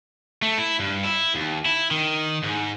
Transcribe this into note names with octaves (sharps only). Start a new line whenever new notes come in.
A3
E4
G2
E4
D#2
E4
D#3
G#2